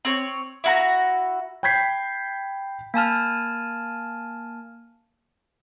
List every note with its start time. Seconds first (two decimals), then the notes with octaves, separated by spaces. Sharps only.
0.05 C4 C#5
0.64 E4 F#4 A#5
1.63 G5 B5 G6 G#6 B6 C7
2.94 A#3 G#5 A5 F6